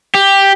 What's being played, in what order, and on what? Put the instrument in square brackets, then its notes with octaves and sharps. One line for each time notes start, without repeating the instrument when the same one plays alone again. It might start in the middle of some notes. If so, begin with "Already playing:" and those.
[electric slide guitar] G4